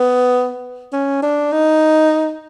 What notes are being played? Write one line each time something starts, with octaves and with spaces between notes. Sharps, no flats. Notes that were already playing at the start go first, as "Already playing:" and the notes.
Already playing: B3
C#4
D4
D#4